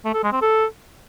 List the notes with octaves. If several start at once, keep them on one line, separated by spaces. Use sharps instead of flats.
A3
A4
G#3
C4
A4